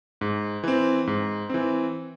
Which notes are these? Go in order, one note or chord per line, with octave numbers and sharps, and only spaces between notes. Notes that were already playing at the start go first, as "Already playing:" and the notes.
G#2
E3 C4
G#2
E3 C4